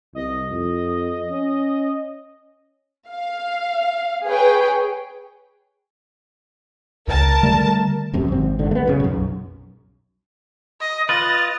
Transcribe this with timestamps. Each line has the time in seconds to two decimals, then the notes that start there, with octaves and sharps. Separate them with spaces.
0.15 C2 D#5
0.50 F2
1.31 C#4
3.09 F5
4.26 G#4 B4 C#5 G5
7.08 C#2 A#4 A5
7.43 D3 G3 A3
8.13 D1 F#2 C3
8.28 G#1 C4
8.59 G#1 D3
8.71 A3 B3
8.86 F#2 A#2 C#3
9.00 B1 F#2
10.81 D#5
11.09 F4 B4 D#5 A6